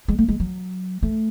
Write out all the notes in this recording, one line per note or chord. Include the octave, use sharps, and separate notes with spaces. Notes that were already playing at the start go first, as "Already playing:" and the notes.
G#3
A3
G#3
F#3
A3